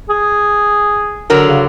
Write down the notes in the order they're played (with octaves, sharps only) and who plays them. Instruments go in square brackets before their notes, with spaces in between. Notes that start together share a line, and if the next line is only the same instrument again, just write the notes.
[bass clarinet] G#4
[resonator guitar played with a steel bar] D3 F#3 A#4
[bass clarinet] C#3